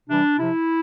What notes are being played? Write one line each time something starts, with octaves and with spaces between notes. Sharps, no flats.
C3 E3 G3 D4
C3 F3 E4